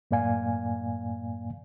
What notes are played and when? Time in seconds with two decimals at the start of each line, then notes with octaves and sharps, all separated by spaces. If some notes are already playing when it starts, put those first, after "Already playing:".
0.11 F#2 A2 A#3 D5 F5 G#5